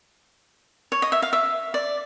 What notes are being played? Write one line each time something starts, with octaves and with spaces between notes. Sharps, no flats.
C#5
D#5
E5
F5
E5
D5